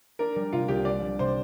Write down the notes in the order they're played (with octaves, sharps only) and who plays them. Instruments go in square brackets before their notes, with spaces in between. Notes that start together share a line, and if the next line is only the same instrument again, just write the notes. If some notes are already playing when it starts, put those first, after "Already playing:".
[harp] D4 [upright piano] A#4
[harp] G3
[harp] C3 [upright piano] F4
[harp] C2 [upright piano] G4
[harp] D4 [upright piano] D5
[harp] G3
[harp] C3 [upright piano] C5